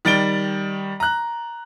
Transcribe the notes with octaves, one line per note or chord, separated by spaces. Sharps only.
D#3 G3 A6 D7 G7
A#5 F#6